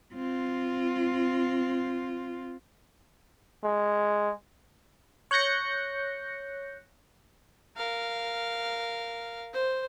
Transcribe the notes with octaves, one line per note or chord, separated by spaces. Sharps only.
C4 F4
G#3
C#5 F#6 G6 A#6 C#7
A#4 F5
C5